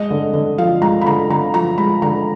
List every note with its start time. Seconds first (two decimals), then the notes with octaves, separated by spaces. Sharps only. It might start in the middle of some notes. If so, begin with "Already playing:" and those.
Already playing: G#3 D#5
0.10 D3
0.33 D3
0.58 F3 F5
0.82 G#3 A#5
1.01 B5
1.06 D3 A#5
1.30 D3 A#5
1.54 F3 A#5
1.78 G#3 B5
2.02 D3 A#5